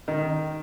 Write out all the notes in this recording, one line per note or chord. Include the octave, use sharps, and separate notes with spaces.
D#3